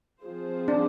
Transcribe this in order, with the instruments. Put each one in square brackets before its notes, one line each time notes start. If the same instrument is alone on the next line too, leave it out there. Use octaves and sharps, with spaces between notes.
[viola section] F3 C4 F4 G#4 C5
[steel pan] D4